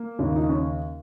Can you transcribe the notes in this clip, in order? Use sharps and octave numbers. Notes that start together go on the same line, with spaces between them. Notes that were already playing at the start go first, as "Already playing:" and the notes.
Already playing: A#3
D#2 C#3
D#4
C#4